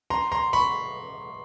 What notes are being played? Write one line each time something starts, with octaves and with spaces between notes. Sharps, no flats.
A#5 C6
A#5 C6
B5 C#6